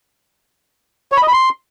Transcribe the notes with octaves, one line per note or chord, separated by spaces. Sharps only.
C#5
B5
D#5
B5
C6